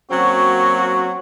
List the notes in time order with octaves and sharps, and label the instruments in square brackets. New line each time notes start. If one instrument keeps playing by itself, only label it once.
[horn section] F#3 A#3 C4 C#4 F#4